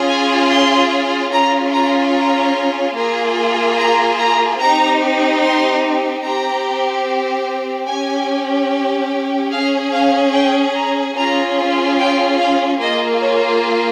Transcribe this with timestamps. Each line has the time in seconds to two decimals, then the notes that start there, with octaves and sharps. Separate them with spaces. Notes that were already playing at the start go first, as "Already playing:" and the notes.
Already playing: C#4 F4 G#4
0.08 G#5
0.50 C6
1.32 C#4 F4 G#4 A#5
1.73 A#5
2.14 A#5
2.95 A#3 F4 G#4
3.78 A#5
4.19 A#5
4.60 C4 D#4 G4 A#5
5.42 C6
6.24 C4 G4 A#5
7.88 C#4 G4 G#5
9.52 C#4 G#4 F5
9.93 F5
10.34 G5
10.75 A#5
11.16 C#4 F4 G#4 A#5
11.98 G5
12.39 F5
12.80 A#3 F4 G#4 D#5
13.21 C#5